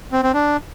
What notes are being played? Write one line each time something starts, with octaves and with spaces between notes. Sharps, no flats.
C4
C4
D4